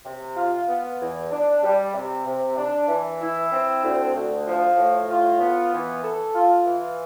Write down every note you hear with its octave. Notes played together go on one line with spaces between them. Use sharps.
C3
F4
B3
E2
D4
G3
C3
C3
D4
E3
E4
C4
D2
D2
F3
A2
F4
B3
E3
A4
F4
E3